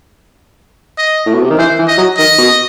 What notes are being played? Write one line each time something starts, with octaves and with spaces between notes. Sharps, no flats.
D#5
A2
B2
C3
D#3
E3 C5
E3
D#5
F#3
D#3 D#5
B2